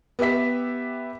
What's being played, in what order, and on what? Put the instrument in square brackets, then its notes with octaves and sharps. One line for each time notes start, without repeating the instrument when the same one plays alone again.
[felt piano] B3 G4 B4 E5 B6